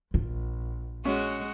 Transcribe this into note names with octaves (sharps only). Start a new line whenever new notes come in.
A#1 F4
G#3 C#4 F#4